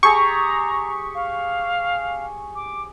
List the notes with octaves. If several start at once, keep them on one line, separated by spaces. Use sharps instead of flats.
G4 G#4 A#5 C#6
F5
D6